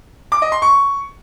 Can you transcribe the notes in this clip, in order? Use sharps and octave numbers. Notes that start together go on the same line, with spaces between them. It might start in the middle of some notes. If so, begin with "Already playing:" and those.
D6
D#5
C6
C#6